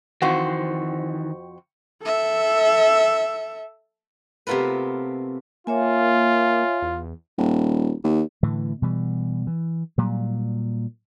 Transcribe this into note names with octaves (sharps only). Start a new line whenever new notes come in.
F2 D#3 E3 C4 F#4
A4 E5
C3 A3 B3 F4 A#4 B4
A#3 F4 C#5 E5 G#5
E2
D#1
D#2
A2 D3 E3
B2 E3 G3
E3
A#2 F#3 G3